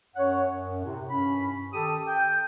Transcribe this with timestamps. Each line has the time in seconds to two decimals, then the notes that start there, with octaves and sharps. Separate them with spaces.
0.16 F#2 C#5 F#5
0.50 F#2
0.83 A2 C3
1.10 G2 C#4 B5
1.73 D#3 G4 A4 A5 D#6
2.07 G5